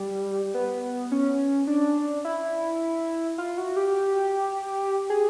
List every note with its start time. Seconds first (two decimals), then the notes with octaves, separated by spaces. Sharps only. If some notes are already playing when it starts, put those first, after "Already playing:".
Already playing: G3
0.54 B3
1.12 C#4
1.67 D4
2.25 E4
3.38 F4
3.58 F#4
3.76 G4
5.10 G#4